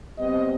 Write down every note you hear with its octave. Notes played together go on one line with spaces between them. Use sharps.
B2 G3 C4 D#5